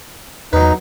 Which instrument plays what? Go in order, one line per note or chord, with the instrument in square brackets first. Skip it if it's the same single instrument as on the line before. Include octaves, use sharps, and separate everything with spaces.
[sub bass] E2 [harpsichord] F#3 B4 [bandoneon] D#4